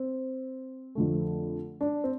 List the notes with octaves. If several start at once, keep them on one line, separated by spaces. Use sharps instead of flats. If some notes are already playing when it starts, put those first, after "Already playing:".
Already playing: C4
F2 D3 A3
D4
C4